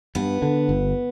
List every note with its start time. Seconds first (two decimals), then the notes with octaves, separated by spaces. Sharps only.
0.15 G2 B3
0.42 D3
0.69 G1